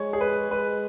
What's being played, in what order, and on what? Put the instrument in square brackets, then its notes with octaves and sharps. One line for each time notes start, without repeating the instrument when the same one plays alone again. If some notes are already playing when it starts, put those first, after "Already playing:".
Already playing: [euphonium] G#3 [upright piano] C#5
[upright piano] G#4
B4
[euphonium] G#3 [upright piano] B4